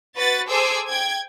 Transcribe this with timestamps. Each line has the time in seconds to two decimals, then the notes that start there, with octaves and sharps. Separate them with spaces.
0.16 F#4 B4 A6
0.48 G#4 A4 C5 G#5 D6 E6
0.88 G5 G#6